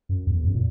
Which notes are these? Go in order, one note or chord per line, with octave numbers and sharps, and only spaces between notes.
F#2
E2
F#2
A#2